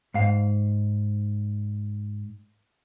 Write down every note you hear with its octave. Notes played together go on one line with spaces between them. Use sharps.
G#2 F5